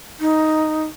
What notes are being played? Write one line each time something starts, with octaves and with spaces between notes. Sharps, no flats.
D#4